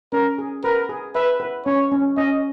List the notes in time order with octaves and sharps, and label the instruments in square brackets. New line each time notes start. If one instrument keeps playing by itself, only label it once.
[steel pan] C#4 [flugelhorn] A#4
[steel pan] G#4
[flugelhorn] A#4 [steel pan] B4
[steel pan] G#4
[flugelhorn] B4 [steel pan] E5
[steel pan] B4
[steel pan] C#4 [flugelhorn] C#5
[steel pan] C#4
[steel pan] C#4 [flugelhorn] D#5